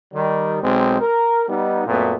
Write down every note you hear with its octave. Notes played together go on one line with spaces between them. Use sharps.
D#3 G3
B1 G#3 C4
A#4
G3 B3 D#4
F#2 A#2 A3 B3